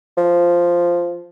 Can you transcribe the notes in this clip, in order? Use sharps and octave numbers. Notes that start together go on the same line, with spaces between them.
F3